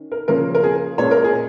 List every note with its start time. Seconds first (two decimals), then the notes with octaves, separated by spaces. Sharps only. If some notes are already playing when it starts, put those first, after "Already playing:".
Already playing: D#3 C#4
0.12 A#4
0.28 C#3 F3 A#3 C#4 A#4
0.55 A#4
0.63 G#4
0.98 A#2 G#3 C#4 C#5
1.11 A#4
1.24 G#4